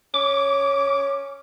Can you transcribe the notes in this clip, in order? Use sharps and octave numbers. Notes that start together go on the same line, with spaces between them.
C#4 D6